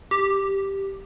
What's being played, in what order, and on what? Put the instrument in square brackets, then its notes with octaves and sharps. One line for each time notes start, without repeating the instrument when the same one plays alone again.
[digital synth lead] G4